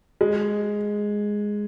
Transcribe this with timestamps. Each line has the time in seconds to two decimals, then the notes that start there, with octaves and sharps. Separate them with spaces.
0.21 G#3